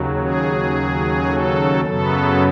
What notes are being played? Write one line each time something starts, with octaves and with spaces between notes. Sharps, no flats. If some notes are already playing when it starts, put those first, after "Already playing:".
Already playing: D#2 C#3 F#3
G#4
A4
F#2 C#3 F#3 B3 A4